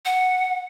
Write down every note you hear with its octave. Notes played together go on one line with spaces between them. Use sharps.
F#5